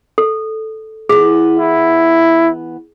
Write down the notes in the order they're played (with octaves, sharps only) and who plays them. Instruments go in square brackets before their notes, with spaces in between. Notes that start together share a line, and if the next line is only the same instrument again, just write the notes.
[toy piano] A4
[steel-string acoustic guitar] E3 B3 [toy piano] G#4
[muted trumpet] E4